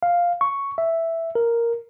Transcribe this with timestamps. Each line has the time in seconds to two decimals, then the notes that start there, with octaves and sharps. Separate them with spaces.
0.03 F5
0.41 C#6
0.78 E5
1.35 A#4